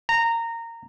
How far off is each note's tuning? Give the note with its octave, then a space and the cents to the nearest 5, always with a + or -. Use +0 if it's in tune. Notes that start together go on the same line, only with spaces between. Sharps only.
A#5 -20